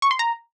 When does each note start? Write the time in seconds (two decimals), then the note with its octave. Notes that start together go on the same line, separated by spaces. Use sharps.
0.02 C#6
0.11 C6
0.19 A#5